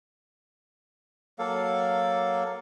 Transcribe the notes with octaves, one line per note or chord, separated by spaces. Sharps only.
F#3 A#3 A4 F5